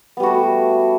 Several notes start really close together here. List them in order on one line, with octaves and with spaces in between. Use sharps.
B3 G3 F#4 A3